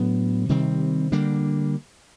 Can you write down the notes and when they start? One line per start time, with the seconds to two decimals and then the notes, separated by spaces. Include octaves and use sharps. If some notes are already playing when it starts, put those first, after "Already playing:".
Already playing: A2 F#3 B3 D4
0.49 C3 D#3 G3 C4
1.12 D3 G3 A#3 D4